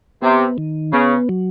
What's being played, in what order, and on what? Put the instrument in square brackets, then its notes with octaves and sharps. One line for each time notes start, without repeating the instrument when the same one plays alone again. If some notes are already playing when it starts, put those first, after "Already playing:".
[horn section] C3 [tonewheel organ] B3
[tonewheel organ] D#3
[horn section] C#3 [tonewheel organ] B3
[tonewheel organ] F#3